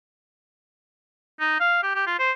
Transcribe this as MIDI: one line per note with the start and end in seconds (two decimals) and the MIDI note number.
1.40 1.60 63
1.60 1.78 77
1.83 1.92 67
1.95 2.02 67
2.06 2.17 65
2.19 2.32 72